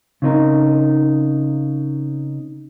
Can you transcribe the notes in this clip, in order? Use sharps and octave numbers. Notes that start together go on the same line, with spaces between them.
C#3 C4 D#4 A#4